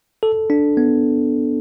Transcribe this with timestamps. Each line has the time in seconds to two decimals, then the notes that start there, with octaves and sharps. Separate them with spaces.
0.23 A4
0.50 D4
0.77 B3